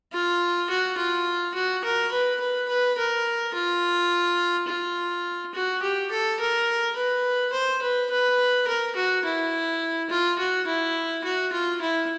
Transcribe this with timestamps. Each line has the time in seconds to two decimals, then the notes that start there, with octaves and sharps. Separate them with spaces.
0.13 F4
0.70 F#4
0.97 F4
1.54 F#4
1.84 A#4
2.12 B4
2.40 B4
2.69 B4
2.98 A#4
3.54 F4
4.68 F4
5.55 F#4
5.82 G4
6.11 A4
6.40 A#4
6.96 B4
7.53 C5
7.82 B4
8.11 B4
8.67 A#4
8.96 F#4
9.25 E4
10.10 F4
10.39 F#4
10.67 E4
11.24 F#4
11.52 F4
11.81 E4